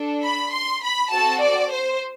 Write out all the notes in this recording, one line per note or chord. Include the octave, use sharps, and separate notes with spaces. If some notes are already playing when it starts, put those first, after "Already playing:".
Already playing: D4 A4
B5
C6
B5
C4 F#4 A4 A5
D5
C5